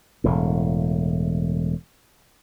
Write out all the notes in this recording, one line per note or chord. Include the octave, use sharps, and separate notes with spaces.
E1 A2